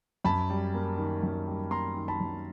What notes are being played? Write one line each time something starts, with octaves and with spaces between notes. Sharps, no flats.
F#2 A5 B5
G3
A#3
D#3
F#2
G3
A#3 A#5 C6
D#3
A5 B5
F#2